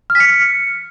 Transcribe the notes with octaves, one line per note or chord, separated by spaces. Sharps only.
F6
B6
C#7